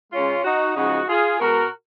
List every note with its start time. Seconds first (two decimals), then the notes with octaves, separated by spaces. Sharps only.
0.12 C#3 G#3 C#4 F4
0.44 D#4 F#4
0.76 C#3 F3 G#3 D#4 F#4
1.08 F4 G#4
1.40 B2 G#3 F#4 A#4